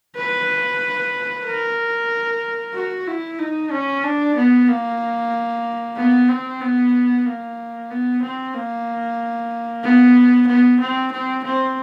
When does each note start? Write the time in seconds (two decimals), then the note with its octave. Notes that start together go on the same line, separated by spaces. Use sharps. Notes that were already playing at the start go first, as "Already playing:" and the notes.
0.17 B4
1.46 A#4
2.74 F#4
3.07 E4
3.39 D#4
3.71 C#4
4.03 D4
4.36 B3
4.68 A#3
5.97 B3
6.29 C4
6.61 B3
7.26 A#3
7.90 B3
8.22 C4
8.54 A#3
9.83 B3
10.48 B3
10.80 C4
11.12 C4
11.44 C4